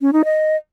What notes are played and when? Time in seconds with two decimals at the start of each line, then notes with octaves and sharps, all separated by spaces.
0.01 C#4
0.13 D#4
0.25 D#5